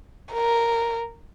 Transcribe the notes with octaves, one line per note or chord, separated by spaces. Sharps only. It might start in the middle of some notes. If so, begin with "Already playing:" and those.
A#4